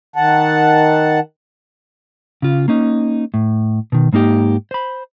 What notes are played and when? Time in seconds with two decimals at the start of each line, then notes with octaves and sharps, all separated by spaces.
0.16 D#3 F#5 A5
2.42 C#3 F4
2.68 A#3 C#4 D#4
3.34 A2
3.92 B2 D#3
4.13 G#2 A#3 D#4 G4
4.71 C5 B5